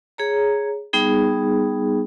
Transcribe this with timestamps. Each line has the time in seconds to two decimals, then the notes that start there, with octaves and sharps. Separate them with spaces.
0.18 G#4 C#5 A#5
0.93 G3 B3 D#4 G#4